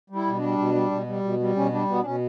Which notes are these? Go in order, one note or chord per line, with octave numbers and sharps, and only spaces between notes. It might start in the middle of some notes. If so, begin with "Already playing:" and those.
G3
E4
B2
D4
G3
B2
G3
B2
G3
B2
G3
B2 C#4
G3 D4
B2 B3
D4
B2 C#4